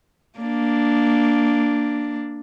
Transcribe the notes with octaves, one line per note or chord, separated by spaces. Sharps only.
A#3 D4